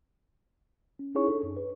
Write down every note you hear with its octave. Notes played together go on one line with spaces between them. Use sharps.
C#4
C#4 D#4 E4 G#4 C#5 C#6
D4 A4
F#2
B4